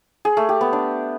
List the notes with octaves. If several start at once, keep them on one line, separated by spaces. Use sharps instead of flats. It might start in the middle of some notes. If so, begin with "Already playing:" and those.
G#4
A3
G4
B3
D4